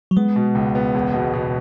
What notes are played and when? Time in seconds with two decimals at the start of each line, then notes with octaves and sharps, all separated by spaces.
0.11 F#3
0.16 G#3 B3
0.36 B2
0.55 C#2
0.75 B3
0.95 E1
1.14 B2
1.34 B2